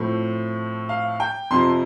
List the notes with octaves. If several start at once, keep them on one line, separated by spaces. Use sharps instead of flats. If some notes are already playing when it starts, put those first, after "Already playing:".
Already playing: A2 F3 A3 C4
F5
G5
F2 C3 F3 C6